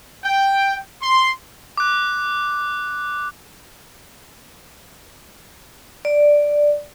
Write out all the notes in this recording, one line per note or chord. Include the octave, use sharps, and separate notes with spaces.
G5
C6
D6 F#6
D5